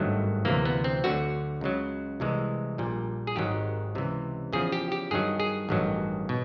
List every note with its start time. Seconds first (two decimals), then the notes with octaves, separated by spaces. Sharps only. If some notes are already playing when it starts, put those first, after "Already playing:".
Already playing: G#1 G2 D#3 F#3 A3
0.45 D2 C3 E3 A#3
0.65 B3
0.84 C4
1.04 D2 D3 F#3 F#4
1.61 C#2 C#3 F#3
2.20 C2 C3 E3 G#3
2.78 A#1 A#2 G3
3.27 G#4
3.36 G#1 G#2 D#3 F#3 G4
3.95 C#2 C3 E3
4.53 E2 C#3 F3 G#4
4.72 G4
4.92 G4
5.11 G2 D#3 F#3 G#4
5.40 G#4
5.69 A1 G2 D#3 F#3
6.29 B2